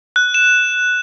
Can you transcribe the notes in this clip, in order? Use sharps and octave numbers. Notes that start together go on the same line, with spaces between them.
F#6
E7